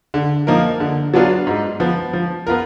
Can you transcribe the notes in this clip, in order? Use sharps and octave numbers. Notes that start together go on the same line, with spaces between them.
D3
F3 A#3 D#4 A#4
D3
F#3 B3 D4 F4
G#2
F3 B3
F3
B3 F4 A#4